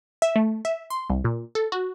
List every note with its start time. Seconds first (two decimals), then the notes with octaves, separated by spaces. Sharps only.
0.22 E5
0.36 A3
0.65 E5
0.90 C6
1.10 C2
1.24 A#2
1.55 A4
1.72 F#4